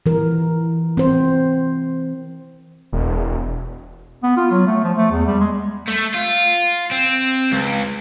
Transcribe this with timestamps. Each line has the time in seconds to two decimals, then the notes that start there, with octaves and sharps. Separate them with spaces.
0.06 E3 A#4
0.97 C4 C5
2.93 E1
4.23 B3
4.37 F4
4.51 F#3
4.67 A3
4.84 F3
4.98 A3
5.11 E2
5.26 G3
5.40 G#3
5.88 A3
6.14 F4
6.92 C4
7.52 C#2